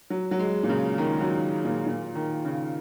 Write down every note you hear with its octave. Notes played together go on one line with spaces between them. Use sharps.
F#3
F#3
G#3
A#2
C#3
D#3
F#3
A#2
A#2
D#3
C#3